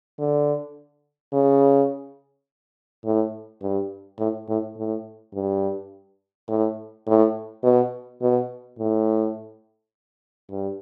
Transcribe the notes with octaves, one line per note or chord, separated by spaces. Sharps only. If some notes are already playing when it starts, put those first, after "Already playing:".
D3
C#3
A2
G2
A2
A2
A2
G2
A2
A2
B2
B2
A2
G2